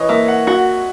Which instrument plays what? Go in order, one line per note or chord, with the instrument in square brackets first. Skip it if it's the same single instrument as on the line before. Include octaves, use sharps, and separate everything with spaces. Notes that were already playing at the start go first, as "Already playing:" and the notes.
Already playing: [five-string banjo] E3 [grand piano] C#5 D#5
[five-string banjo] A#3 [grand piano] E5
[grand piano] F#5
[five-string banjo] F#4 [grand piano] F#5